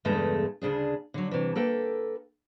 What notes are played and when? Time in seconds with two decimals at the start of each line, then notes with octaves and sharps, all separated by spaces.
0.05 E2 G2 C#3 G#3 A3 A4
0.61 D2 C#3 D4 G#4
1.14 D3 F#3
1.31 C3 E3
1.55 A#3 A4 B4 G5